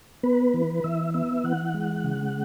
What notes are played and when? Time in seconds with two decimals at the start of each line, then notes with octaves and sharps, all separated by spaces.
0.23 B3 B4
0.54 E3
0.84 E3 E5
1.14 B3 E5
1.44 E3 F#5
1.74 G#3
2.04 C#3